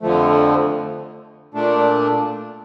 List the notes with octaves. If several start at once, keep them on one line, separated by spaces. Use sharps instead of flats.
F2 D3 F3 A3
A#2 A3 D4